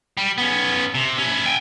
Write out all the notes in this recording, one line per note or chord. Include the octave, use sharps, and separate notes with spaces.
G3
B3 C#4
C3
C#4 E4
G5 G#5